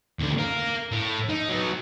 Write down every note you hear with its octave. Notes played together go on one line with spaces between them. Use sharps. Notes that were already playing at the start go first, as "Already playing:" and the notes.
D#2 D3
A#4 F5
A2
D#4
F#3 B3